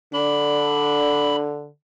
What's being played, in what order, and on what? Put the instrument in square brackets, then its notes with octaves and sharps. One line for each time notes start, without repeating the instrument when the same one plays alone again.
[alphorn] D3 [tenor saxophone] D4 [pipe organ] B5